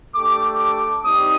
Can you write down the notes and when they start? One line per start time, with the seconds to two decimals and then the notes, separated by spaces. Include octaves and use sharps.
0.13 A3 D4 G4 D6
0.58 D6
1.04 G3 C4 D#4 G4 D#6